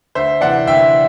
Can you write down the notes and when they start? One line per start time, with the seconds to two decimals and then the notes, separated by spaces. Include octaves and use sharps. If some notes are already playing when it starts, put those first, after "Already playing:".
0.15 D2 C5 E5
0.41 C3 E3 D5 F#5
0.67 D2 E5 G5